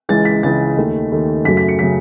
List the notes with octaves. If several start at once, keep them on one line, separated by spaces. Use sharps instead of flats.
C#2 C#3 E3 G#3 A6
B6
C#2 C#3 E3 G#3 A6
D#2 D#3 A3
D#2 D#3 A3
F#2 C#3 F#3 A3 B6
B6
C#7
C#3 F#3 A3 B6